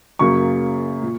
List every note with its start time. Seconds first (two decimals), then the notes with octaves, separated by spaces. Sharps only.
0.19 F#2 C#3 F#3 A#3 C#6
1.02 A#2